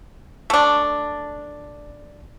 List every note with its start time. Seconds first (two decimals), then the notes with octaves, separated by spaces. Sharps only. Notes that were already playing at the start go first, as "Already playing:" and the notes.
0.50 A3 D4